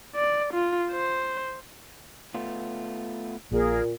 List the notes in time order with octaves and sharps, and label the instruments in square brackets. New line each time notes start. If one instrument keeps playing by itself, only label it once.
[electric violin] D5
F4
C5
[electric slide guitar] A3 B3 F4
[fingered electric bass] A#1 [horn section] A#2 [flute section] G#4 A#4